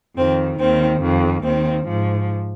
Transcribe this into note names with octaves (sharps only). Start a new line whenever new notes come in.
F2 D#3 C4
D#2 D#3 C4
F2 D#3
D#2 D#3 C4
G#2 F3